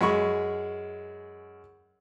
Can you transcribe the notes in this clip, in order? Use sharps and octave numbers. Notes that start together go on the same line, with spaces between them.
F#2 G#3 B5 C#6